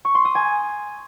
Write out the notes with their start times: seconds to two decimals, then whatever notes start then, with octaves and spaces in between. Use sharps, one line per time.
0.05 C#6
0.15 C6
0.25 D#6
0.35 G#5